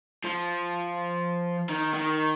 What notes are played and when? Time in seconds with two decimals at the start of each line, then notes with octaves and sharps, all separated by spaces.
0.24 F3
1.69 D#3
1.94 D#3